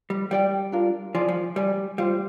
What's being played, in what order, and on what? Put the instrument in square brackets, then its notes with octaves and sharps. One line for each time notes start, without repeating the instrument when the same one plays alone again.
[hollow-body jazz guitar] G3
[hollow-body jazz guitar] G3 [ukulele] G4 D5 G5
[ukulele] D4 F4 A#4
[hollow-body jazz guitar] F3 [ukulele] G#4 D5 G#5
[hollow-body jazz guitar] F3
[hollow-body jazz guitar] G3 [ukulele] G4 D5 G#5
[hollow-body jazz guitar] G3 [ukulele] F4 C5 F5